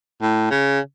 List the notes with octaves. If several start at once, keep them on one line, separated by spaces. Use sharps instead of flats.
A2
C#3